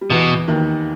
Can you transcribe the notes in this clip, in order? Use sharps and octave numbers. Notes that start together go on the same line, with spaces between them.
G3
E2 B2 E3
D#2 D#3